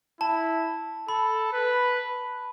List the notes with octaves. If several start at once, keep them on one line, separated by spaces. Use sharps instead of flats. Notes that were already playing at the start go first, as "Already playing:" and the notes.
E4 A5
A4 B5
B4